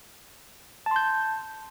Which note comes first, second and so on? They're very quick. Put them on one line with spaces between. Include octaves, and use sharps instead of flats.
A5 C6 G6